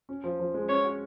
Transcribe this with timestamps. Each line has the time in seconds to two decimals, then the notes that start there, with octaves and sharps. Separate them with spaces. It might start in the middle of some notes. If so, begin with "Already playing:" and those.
0.09 C#4
0.24 F3
0.40 F3
0.54 G#3
0.69 C#4 C#5
0.84 F#4